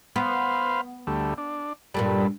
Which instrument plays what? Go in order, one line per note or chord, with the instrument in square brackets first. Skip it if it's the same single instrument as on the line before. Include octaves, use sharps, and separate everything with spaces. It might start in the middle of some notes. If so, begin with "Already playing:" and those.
[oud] B3 [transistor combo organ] B4 C5 F5
[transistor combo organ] D2 G3 A3
D4
[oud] G2 A#2 G3 [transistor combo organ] A4 B4